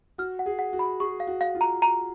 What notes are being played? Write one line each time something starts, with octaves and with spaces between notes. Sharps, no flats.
F#4 F6
F#5
G#4
F#5
F#4
B5
G#4 C#6
F5
F#4
F5
F4
A#5
A#5